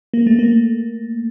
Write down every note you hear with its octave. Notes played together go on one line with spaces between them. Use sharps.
A#3
A3
A#3